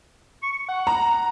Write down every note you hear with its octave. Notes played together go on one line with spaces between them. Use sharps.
C#6
F#5
A#5